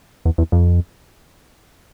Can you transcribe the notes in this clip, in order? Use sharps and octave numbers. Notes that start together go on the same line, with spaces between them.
E2
E2
F2